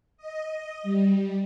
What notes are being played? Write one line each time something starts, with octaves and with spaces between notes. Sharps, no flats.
D#5
G3